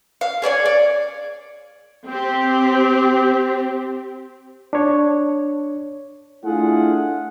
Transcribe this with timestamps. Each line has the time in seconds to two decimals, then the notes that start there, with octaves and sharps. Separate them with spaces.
0.21 F5
0.42 G#4 C#5 D5 G#5
0.66 D5
2.08 C4 G4
4.73 D4 C#5
6.45 A3 D4 E4 F4 G#4 F#5